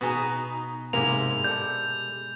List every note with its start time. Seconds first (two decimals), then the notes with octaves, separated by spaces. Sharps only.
0.01 B2 B3 D#4 F#4 G#4
0.93 G#2 C3 G#3 A#3 E4 G4 F7
1.44 A4 D5 G6